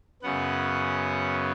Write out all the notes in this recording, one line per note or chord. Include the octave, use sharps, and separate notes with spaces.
F#2 C#3 B3 F#5